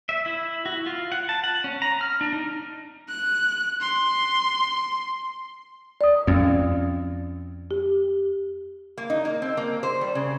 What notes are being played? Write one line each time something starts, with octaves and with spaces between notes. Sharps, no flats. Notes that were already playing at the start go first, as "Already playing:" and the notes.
E5
E4
F#4
F4
F#5
A5
F#5
C#4
A#5
F6
D4
D#4
F#6
C6
D5 D#6
F2 C#4
G4
A#3
D#4
A#3
C4
A#3
C5
G3
C#3